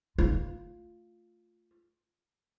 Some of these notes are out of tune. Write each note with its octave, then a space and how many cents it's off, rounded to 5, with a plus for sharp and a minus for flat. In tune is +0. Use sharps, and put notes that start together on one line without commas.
A3 +5 F4 +0